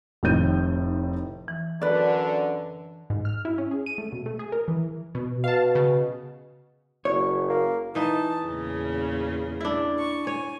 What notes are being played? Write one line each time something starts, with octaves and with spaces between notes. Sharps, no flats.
F1 A2 D#3 C#5 G6 D#7
E3
F#2 D3 B4 D5
G#2
F6
E4
C#4
G#4
D#7
A3
B2
A3
G#4
A#4
E3
B2
B2 F5 A5
C#3
F#1 C#5
A#3
E3 D#4 A5
E2 A#2 C#3
D4 E4
C#6
C#5 G#5